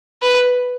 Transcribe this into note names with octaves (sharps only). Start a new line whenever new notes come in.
B4